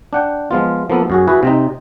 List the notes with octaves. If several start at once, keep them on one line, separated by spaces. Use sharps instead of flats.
D4 F#5 G5
F3 G#3 B3 F4
F3 A#3 B3 A4
F#2 F#4 G#4
E4 F#4 G#4 B4
C3 C4 D#4